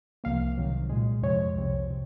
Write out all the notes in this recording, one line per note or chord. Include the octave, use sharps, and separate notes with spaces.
C2 C3 F3 A#3 F5
C2 C3 D#3 F#3
A#2 G#3
F2 C3 F3 G#3 C#5
C2 C3 F3
C3